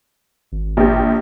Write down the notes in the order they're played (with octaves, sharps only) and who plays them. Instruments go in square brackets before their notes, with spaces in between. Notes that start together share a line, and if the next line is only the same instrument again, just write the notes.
[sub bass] G#1
[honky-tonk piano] A#1 G4